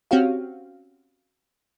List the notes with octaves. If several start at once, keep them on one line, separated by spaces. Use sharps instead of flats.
C4 C#4 F#4 G4 F5